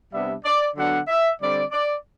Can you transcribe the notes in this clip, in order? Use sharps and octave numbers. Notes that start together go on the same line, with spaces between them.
C3 G3 B3 D4 E5
D5
D3 F#3 B3 D4 F#5
E5
D3 G3 C4 D5
D5